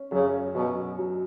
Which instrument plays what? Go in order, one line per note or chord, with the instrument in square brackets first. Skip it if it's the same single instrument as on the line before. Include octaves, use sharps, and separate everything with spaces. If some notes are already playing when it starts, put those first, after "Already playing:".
Already playing: [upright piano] C#4
[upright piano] F#2 [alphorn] C#3
[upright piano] F#2 [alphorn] B2
[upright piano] F#3